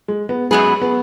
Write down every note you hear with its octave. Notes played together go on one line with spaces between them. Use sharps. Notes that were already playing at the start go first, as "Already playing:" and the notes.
G#3
B3
F#2 F#3 G#3 B3 G#4 B4
B3